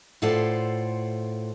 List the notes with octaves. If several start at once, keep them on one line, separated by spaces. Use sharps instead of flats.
A2 F4 A4 C5 D5 F#5